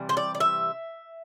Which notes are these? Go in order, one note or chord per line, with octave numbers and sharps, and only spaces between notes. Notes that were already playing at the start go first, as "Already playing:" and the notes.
Already playing: C3 E3 G3
C5
D5
D5
E5